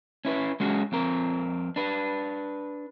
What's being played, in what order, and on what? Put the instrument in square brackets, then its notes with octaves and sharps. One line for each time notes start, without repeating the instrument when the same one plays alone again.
[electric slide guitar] C#4 E4 B4
G#3 C#4 F#4 G#4
F2 C4 A#4
D4 B4